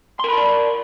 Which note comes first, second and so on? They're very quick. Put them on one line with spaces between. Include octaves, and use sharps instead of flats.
C6 A#4 B5 A5 D5